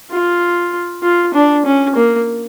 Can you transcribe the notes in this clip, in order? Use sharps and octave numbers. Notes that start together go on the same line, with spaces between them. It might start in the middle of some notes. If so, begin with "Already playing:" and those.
F4
F4
D4
C#4
A#3